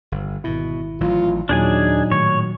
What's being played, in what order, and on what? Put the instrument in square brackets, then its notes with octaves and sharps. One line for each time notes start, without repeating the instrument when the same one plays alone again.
[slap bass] G1
[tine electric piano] G#1 E4 [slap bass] B2
[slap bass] A1 E3 F#3 [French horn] F4
[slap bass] D#2 [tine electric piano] A#2 F#3 [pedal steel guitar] D4 G#4 G#5 [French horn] D#4
[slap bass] A2 D#3 [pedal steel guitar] C#5